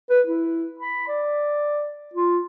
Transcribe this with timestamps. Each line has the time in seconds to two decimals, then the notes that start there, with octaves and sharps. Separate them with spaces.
0.10 B4
0.27 E4
0.79 B5
1.08 D5
2.14 F4